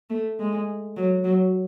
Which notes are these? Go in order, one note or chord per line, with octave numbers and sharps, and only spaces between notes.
A3
G#3
F#3
F#3